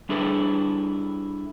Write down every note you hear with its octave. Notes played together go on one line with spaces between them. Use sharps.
G3 D4 E4 G#4 A4 B4